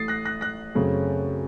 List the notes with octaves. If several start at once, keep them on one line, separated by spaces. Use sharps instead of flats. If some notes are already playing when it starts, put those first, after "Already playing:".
Already playing: A1 A2 A3 D#6 A6 C7
F#6 A#6
F#6 A#6
F#6 A#6
F#2 C#3 A3 C4